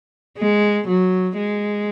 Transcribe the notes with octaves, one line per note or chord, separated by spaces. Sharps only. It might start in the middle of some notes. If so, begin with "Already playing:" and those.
G#3
F#3
G#3